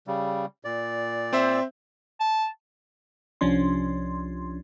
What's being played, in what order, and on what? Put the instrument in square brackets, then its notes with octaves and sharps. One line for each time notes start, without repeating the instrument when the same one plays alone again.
[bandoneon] C#3 G3
A#2 D5
[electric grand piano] C4 C5 E5
[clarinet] A5
[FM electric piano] C2 F3 C#4 D4 C6